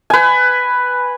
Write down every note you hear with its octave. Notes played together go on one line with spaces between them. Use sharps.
B4 G#5